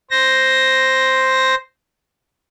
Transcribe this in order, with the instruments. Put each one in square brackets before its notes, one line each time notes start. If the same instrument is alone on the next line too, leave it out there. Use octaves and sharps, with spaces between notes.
[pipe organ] C5 A#6